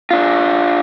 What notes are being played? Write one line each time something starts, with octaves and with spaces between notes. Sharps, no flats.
D4 F4